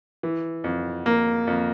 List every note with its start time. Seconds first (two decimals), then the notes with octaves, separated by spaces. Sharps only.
0.23 E3
0.64 F2
1.06 A#3
1.47 F2